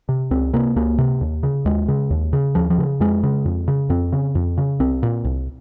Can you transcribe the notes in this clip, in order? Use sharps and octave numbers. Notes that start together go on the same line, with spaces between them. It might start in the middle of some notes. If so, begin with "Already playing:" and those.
C3
C#2 C4
C3 A#3
C#2 A#3
C3
D#2
C#3
D#2 G#3
C#3
D#2
C#3
D#2 F3
F3
C#3
F2 G#3
C#3
F2
C#3
F2 C4
C#3
F2
C#3
C2 C4
A#2
C2